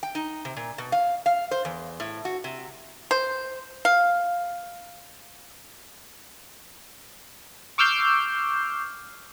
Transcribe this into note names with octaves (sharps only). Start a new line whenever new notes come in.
G5
D#4
C3
A#2
B2
F5
F5
C5
E2
A2
F#4
C3
C5
F5
C#6 D6 E6 F6 G6 C7